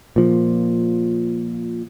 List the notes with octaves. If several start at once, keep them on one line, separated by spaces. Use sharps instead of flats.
A#2 F3